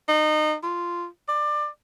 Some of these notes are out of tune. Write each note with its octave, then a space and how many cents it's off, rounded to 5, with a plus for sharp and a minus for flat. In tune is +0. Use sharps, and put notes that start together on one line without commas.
D#4 -25
F4 -10
D5 +25